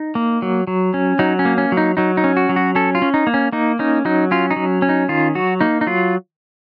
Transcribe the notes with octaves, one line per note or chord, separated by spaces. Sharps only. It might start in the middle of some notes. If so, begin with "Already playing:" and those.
Already playing: D#4
A#3
F#3
F#3
C#4
F#3 D#4
C#4
A#3
C#4
F#3
D#4
F#3 D#4
D#4
C#4
F#4
F#3
F#4
C#4 A4
F4
C#4
D#4
A#3
C#4
A#3 D#4
C#4 D#4
F#3 D#4
C#4 F4
D#4
F#3
C#4
D#4
D#3 F4
F#3 F#4
A#3 D#4
D#4
F#3 F4